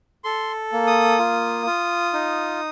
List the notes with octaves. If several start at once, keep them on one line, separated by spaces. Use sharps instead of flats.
A4 C6
A#3
D#6
F4
F4
D#4